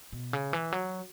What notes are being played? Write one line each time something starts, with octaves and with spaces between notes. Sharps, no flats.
B2
C#3
E3
F#3